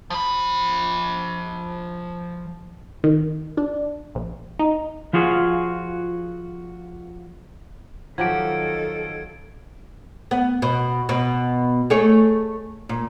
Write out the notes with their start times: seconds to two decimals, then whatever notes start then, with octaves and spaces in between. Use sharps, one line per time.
0.10 F3 B5
3.04 D#3
3.57 D4
4.15 A#1
4.59 D#4
5.13 F3 F4 F#4 G#4
8.18 D#3 F3 F#3 G4 A4 G#6 D7
10.31 B3
10.62 B2
11.09 B2
11.90 A3 G#4 C#5
12.89 A#2